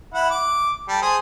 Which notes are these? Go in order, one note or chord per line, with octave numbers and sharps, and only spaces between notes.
E4 F#5
D6
G3 A4
G#4 C5